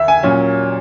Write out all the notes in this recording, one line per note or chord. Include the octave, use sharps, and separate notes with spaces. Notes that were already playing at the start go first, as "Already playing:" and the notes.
Already playing: D#2 E5
G#5
A#2 F#3 C#4